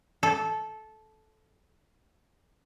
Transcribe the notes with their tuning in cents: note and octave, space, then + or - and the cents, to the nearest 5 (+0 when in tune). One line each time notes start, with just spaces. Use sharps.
A4 -15